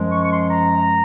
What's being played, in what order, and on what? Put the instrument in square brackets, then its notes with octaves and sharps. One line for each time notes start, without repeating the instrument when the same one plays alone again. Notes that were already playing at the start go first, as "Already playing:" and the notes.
Already playing: [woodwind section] F#2 F3 G#3
C#6
C#6
C6
A#5